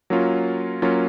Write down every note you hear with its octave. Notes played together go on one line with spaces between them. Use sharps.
F#3 A#3 C#4 F4
F#3 A#3 C#4 F4